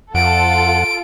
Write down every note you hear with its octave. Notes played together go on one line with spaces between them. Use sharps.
F2 F4 A4 F#5 D7